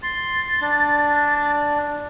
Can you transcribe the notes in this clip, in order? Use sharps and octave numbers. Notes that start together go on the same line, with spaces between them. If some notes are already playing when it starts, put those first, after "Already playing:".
C6 A6
D4